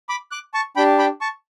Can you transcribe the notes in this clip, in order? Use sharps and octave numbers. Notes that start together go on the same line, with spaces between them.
B5 D6
D6 F#6
A5 C#6
D4 G4 G5 B5
G5 B5
A5 C#6